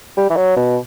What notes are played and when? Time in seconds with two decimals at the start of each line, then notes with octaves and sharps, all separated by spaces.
0.17 G3
0.30 E3
0.37 F#3
0.56 B2